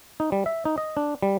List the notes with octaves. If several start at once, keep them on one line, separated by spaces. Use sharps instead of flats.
D#4
G3
E5
D#4
D#5
D4
G3